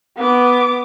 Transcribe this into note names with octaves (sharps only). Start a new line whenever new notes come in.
B3 D6